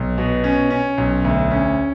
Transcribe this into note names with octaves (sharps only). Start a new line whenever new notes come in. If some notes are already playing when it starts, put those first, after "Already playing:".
Already playing: B1
B2
C#4
C#4
B1
D2
C#4